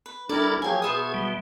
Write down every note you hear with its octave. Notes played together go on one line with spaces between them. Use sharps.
B4
G3 D4 E4 A4 A#4 D5
F3 F#3 A#3 G4 G#4 G#5
B2 B3 C5 E5 D#6
G3